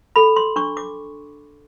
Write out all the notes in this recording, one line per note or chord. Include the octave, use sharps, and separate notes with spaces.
A4 B5
C6
D4 C#6
D6